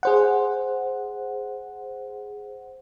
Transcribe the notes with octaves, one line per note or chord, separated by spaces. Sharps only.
G#4 C5 F#5